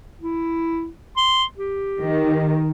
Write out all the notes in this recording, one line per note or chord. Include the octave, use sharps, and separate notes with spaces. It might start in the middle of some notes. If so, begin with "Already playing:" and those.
E4
C6
G4
D#3